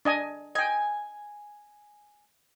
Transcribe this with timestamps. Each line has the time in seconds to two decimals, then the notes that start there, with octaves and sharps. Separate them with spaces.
0.05 D4 D#5 G#5
0.55 D#5 G5 G#5